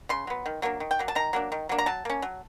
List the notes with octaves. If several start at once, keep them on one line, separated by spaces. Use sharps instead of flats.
C#3 C6
F#3 B3
D#3
F#3 A#3 D4
D#3
G5
F#3 A#3
A5
D#3 A#5
F#3 A#3 D4
D#3
F#3 A#3 D4
A#5
F#3 A5
A#3 C#4
F#3